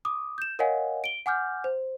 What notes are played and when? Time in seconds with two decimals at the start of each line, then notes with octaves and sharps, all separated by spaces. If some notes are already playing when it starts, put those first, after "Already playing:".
0.05 D6 D#6
0.38 G6 E7
0.59 A#4 C#5 D#5 F5 F#5 G#5
1.04 D7 G7
1.26 F#5 G#5 D6 F6 G6
1.64 C5